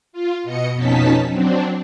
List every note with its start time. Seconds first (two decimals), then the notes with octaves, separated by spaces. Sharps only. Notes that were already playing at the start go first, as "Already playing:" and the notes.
0.13 F4
0.44 B2 D#5 C#7
0.74 F2 B2 C#4 D#4 A5 B6
1.29 F#3 C4 D4